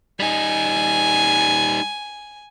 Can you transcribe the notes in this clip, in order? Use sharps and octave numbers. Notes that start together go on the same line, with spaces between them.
G3 D#4 G#5